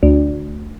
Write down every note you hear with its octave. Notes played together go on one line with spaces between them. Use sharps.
D2